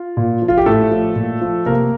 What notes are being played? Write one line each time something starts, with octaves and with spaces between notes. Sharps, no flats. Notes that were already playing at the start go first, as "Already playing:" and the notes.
Already playing: F4
A#2
F3
F4
G4
A2 A3 A4
F3
A#2
F3
C3 A#3 A#4